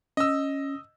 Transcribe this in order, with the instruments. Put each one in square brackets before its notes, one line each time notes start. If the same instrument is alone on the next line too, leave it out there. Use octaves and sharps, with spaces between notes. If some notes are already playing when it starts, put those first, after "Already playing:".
[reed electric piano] C#4 [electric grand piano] D#5 E6